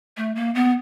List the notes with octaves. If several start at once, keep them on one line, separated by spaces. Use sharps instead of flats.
A3
A#3
B3